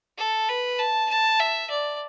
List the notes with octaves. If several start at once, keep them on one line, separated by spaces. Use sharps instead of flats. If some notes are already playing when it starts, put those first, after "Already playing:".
A4
B4
A5
A5
E5
D5